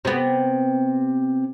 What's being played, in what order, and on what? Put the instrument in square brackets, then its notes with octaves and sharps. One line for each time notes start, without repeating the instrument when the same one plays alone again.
[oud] C3 B3